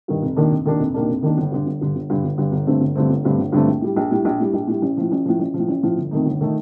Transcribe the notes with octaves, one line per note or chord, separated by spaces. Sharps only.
G2 D#3
F1
D#2 D#3 A#3 D4
F1
D#2 D#3 A#3 D4
F1
D#2 D#3 A#3 D4
F1
D#2 D#3 A#3 D4
G1
G2 D3
G1
G2 D3
G1
G2 D3
G1
G2 D3
G1
G2 D3 A3 C4
G1
G2 D3 A3 C4
G1
G2 D3 A3 C4
G1
G2 D3 A3 C4
A#1
A2 G3
A#1
A2 G3
A#1
A2 G3
A#1
A2 G3
A1
A2 F3
A1
A2 F3
A1
F3
A2
A1
A2 F3
G1
F2 D#3 A3 D#4
G1
D#3 A3 D#4